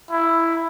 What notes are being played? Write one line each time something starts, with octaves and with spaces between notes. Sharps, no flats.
E4